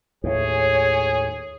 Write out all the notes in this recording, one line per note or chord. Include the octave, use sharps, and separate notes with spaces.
D#2 A2 G#4 C#5